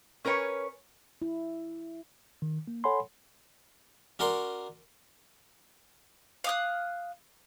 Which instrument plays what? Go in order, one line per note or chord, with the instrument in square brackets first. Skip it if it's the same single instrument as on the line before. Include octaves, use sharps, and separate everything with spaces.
[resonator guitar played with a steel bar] C#4 A#4 B4 C#5 G#5
[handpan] E4
[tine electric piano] D#3
A#3
A4 C#5 F#5 G#5 B5 C6
[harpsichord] C#4 F#4 A#4 D5 C6
[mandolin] F5 D#6 F#6